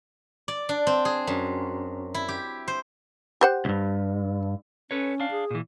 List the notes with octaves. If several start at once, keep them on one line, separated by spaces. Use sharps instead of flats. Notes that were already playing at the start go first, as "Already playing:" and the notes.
D5
D4
C4
G#4
F#2
E4
G4
C5
G4 C5 F#5
C#2 G2
C#4 A4 B4 C#5
D4 F5
G#4
A#2 E3